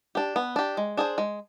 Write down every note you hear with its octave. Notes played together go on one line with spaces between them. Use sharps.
D4 G4
B3
D4 G4
G#3
D4 G#4 C5
G#3